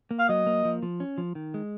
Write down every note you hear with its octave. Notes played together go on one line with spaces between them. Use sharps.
A#3
F5
F#3 D#5
A#3
F3
F3
C#4
F3
D#3
G#3